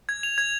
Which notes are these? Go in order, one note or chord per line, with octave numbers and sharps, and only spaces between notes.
G#6
F7
G#6